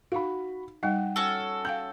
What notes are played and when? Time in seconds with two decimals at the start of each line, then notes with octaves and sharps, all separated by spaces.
0.12 D#4 F#4 F5 B5
0.83 G3 D#4 D#5 F#5 G5
1.16 C#4 F#4 A4
1.65 F5 G5 A5 G6